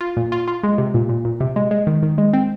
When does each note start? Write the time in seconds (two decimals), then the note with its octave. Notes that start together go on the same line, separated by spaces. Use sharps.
0.01 F4
0.17 A#2
0.32 F4
0.48 F4
0.63 G#3
0.78 C3
0.94 A#2
1.09 A#2
1.25 A#2
1.40 C3
1.56 G#3
1.71 G#3
1.87 D#3
2.03 D#3
2.18 G#3
2.33 C4